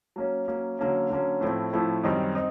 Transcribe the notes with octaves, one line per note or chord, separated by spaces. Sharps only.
F#3 A#3 C#4
F#3 A#3 C#4
D3 F#3 A#3 C#4
D3 F#3 A#3 C#4
A2 F3 A3 C4 E4
A2 F3 A3 C4 E4
F#2 D#3 G3 C4 D#4
C4 D#4